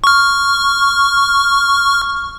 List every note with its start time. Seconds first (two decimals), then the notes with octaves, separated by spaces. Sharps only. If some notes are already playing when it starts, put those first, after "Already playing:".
0.04 C#6 F6